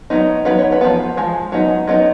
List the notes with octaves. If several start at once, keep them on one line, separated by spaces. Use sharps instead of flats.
F#3 B3 D#4
F#3 B3 D#4 B4
C#5
B4
F3 G#3 B3
F3 G#3
F#3 B3 D#4
F#3 B3 D#4 D#5